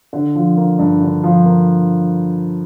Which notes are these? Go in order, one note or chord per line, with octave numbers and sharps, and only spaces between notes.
D3
F3
A#3
G2
D3
F3
A#3